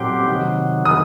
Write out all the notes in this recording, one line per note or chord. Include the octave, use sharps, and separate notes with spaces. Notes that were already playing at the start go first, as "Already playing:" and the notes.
Already playing: A#2 F#3 C4 G4 D6
C3 D#3 F#3
D#3 D#6